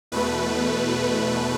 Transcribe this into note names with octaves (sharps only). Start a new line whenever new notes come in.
E2 B2 A3 B4